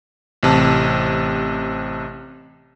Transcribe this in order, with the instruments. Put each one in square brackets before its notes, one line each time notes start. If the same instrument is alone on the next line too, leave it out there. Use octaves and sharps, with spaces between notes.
[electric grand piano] A1 C3 A5